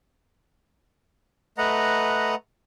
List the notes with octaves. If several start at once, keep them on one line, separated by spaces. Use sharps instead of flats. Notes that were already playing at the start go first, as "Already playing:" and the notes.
A3 B4 D#5 F#5 A#5